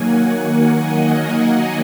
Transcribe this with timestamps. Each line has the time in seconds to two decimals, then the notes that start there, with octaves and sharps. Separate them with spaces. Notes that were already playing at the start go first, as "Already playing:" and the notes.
Already playing: D#3 F#3 A#3 F#5 G#5
0.34 F#5
0.73 D#5
1.14 F#5